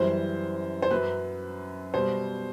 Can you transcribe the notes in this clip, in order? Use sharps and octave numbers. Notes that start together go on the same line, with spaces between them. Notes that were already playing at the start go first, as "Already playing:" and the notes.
Already playing: F#2 E3 G3 C5
C5
F#2 F#3 B4
B2 G3 C5